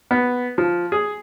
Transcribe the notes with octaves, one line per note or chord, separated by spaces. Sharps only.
B3
F3
G#4